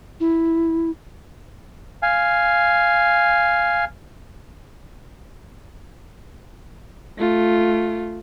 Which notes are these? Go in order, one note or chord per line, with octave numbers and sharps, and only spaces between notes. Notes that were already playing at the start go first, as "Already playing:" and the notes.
E4
F5 G#5
A3 F4